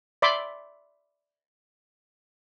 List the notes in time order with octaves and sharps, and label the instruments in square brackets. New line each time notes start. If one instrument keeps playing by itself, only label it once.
[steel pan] D5 E5 B5 C6 D6